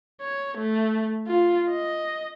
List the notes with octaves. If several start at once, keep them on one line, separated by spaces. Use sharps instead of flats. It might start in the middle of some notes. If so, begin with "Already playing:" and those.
C#5
A3
F4
D#5